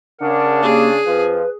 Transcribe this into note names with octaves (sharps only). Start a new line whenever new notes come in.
C#3 D4 A#4 F#5
A#3 G4 G#4
F2 F3 B4